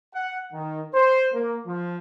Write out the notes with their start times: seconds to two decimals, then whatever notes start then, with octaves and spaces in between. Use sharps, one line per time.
0.14 F#5
0.52 D#3
0.94 C5
1.33 A#3
1.66 F3